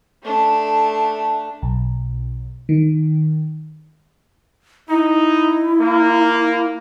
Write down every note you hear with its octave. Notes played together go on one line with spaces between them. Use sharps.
A3 D4
B1
D#3
D#4 E4
A#3